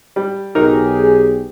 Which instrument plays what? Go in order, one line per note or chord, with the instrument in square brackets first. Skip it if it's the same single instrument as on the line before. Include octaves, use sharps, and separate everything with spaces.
[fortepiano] G3
[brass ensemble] B1 G4 G#4 [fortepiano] F#3 D#4 A#4